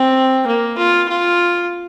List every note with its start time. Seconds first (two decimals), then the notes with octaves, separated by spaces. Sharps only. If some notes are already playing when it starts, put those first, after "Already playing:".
Already playing: C4
0.47 A#3
0.78 F4
1.09 F4